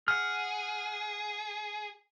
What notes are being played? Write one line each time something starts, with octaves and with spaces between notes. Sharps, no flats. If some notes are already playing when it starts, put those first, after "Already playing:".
G#4 F#5 F6